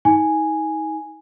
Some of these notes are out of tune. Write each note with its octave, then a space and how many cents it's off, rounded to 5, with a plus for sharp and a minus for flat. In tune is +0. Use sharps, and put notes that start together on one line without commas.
D#4 +35 G#5 +0